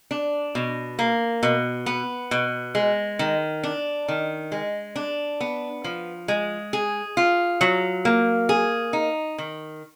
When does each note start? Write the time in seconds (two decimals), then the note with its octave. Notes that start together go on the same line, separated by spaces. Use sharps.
0.11 D4
0.55 B2
0.99 A#3
1.43 B2
1.86 B3
2.31 B2
2.75 G#3
3.19 D#3
3.64 D4
4.08 D#3
4.52 G#3
4.96 D4
5.40 B3
5.84 F3
6.28 G#3
6.73 G#4
7.17 F4
7.61 F#3
8.05 A#3
8.49 G#4
8.93 D#4
9.38 D#3